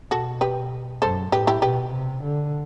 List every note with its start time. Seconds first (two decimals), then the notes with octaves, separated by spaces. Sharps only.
0.11 B2 F#4 A4
0.41 G4 B4
1.02 F#2 A4 C5
1.32 A2 G4 B4
1.47 E4 G4
1.62 B2 G4 B4
1.93 C3
2.23 D3